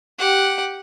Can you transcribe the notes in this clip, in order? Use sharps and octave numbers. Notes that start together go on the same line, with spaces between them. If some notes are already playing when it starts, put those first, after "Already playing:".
G4 F#5